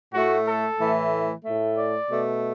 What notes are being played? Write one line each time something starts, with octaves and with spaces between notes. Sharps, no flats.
A2 A3 F#4
A4
A2 E3 A3
A2 A3
D5
B2 A3